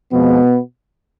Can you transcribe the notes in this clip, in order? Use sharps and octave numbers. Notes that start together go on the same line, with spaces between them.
F2 B2 F3 G#3 B3